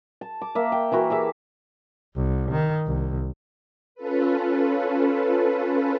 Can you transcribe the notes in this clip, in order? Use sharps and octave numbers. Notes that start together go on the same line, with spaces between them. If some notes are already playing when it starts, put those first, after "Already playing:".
A5
D6
A#3 E5
G5
E3 E4 F#4 A#4
G4 G#4 E5 A5
C2
D#3
C2
C#4 F4 A4 B4